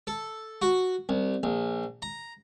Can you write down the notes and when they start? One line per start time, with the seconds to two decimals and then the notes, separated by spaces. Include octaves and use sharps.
0.07 A4
0.62 F#4
1.09 C2
1.43 A#1
2.02 A#5